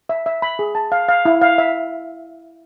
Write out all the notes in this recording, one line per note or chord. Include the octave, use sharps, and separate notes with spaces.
E5
E5
B5
G#4
A5
F5
F5
E4
F5
E5